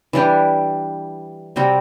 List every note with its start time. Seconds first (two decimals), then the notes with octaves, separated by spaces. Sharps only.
0.13 E3 G3 D4 G4
1.56 C3 G3 C4 F#4